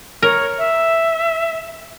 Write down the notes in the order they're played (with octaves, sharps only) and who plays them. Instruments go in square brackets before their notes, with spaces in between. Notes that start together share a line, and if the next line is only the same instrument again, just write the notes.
[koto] A#4 [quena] C#5
[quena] E5